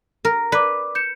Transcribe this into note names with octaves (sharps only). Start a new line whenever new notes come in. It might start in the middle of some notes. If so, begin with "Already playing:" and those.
A#4
B4 D5 D6
G6 C#7 E7